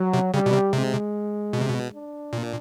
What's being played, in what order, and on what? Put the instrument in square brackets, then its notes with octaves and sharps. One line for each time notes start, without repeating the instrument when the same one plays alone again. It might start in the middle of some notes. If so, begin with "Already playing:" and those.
Already playing: [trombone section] F#3
[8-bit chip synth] C3
[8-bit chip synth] C#3 [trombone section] G3
[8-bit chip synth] B2
C3
[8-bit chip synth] C3 [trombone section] G#3
[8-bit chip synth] B2
C3
B2
[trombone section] D4
[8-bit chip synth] A#2